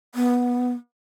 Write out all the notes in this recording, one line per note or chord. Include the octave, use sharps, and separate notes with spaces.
B3